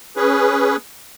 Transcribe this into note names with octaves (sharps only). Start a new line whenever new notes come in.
C#4 G#4 B4